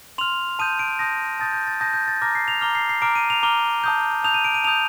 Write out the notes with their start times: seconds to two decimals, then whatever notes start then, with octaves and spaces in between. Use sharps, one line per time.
0.18 C6 F6 F7
0.59 A5 D#6 G6 D#7
0.79 D7
0.99 A5 D#6 G6 A#6
1.40 A5 D#6 G6 A6
1.53 G6
1.67 A6
1.80 A5 D#6 G6 A#6
1.94 G6
2.08 A6
2.22 A#5 D6 F6 A#6
2.35 C7
2.48 F7
2.61 A#5 D6 F6 G7
2.75 C7
2.89 C7
3.02 A#5 D6 F6 D7
3.15 D#7
3.30 F7
3.43 A#5 D6 F6 G7
3.84 A5 D#6 G6
4.24 A5 D#6 G6 F7
4.34 D#7
4.44 D7
4.54 D#7
4.64 A5 D#6 G6 F7